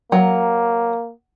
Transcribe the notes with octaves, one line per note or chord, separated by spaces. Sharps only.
F#3 A#3